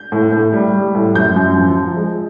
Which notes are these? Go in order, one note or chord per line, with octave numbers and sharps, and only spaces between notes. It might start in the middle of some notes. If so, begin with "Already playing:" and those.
Already playing: G6
A2
A2
G3
G3
A2
F#2 G6
F#2
F3
F3
G#3